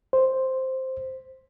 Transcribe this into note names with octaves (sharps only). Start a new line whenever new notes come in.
C5